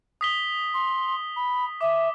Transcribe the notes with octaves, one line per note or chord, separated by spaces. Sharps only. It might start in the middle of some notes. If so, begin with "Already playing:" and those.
D#6 B6 G7
C6
B5
E5 D6